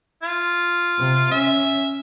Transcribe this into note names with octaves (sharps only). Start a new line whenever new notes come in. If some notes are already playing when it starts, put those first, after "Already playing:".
F4
C3
C#4 E5